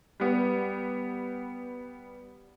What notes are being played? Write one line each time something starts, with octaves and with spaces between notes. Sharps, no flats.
G3 B3